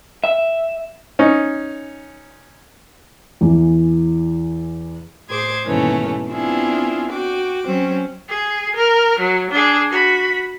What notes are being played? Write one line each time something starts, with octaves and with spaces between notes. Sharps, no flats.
E5
C#4 D#4
E2 E3
A2 G#4 C5 D6 G#6
D#2 G#2 B2 E3 A3 C#4
B3 C4 D4 E4 F4 G#4
F#4 G5 D6
F#3 C4 C#4
G#4
A#4
F#3
D4 G#4
F#4 B5